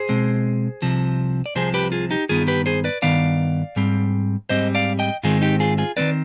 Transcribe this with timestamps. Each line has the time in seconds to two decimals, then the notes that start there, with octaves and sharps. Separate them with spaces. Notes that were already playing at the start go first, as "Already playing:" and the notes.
Already playing: G#4 C5
0.09 B2 G#3 C4
0.82 C2 C3 F3 C4
1.46 D5
1.55 C2 C3 F3 C4 G#4 C5
1.74 G4 B4
1.92 F4 G#4
2.11 D#4 G4
2.29 G2 D#3 B3 F4 G#4
2.47 G4 B4
2.66 G#4 C5
2.84 B4 D5
3.02 G2 D#3 B3 D5 F5
3.76 G#2 G3 C4
4.49 G#2 G3 C4 C5 D#5
4.75 D5 F5
4.99 D#5 G5
5.23 G#2 D#3 G#3 C4 F4 G#4
5.42 D#4 G4
5.60 F4 G#4
5.78 F4 G#4
5.97 D#3 G#3 C4 B4 D5